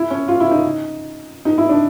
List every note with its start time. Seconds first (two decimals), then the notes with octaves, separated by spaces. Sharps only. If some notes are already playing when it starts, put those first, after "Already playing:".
Already playing: E4
0.10 C#4
0.28 F4
0.40 E4
0.51 D#4
1.45 D#4
1.58 E4
1.69 D4